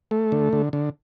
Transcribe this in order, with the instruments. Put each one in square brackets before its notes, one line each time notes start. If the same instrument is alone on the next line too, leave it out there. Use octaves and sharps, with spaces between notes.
[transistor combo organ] A3
D3
D3
D3